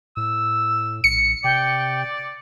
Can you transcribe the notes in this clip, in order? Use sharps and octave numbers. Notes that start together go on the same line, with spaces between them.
A2 E6
A#1 C#7
C3 D5 G5